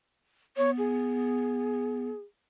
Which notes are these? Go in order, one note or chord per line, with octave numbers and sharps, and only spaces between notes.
B3 C#5
G#4